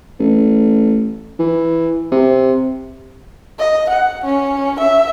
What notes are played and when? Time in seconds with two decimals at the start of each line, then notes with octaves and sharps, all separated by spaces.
0.19 A1
1.39 E3
2.12 C3
3.59 D#5
3.89 F#5
4.25 C#4
4.80 E5